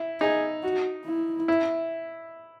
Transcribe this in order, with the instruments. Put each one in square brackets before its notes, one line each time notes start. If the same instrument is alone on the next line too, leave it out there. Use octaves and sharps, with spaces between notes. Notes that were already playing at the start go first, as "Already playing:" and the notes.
Already playing: [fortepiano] E4
[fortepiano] D#4 [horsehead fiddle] G#4
[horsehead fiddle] F#4
E4
[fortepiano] E4